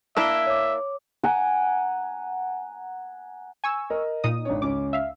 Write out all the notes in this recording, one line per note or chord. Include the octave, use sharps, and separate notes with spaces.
A#3 D4 E4 E5 A#6 D7 G7
C#5 D6
F#5 G#5 A#5
G#5 C#6 E6
A#4 D#5
A#2 D#4 D#6
G#1 D4 C#5
C#2 C#4 D6
E5 F5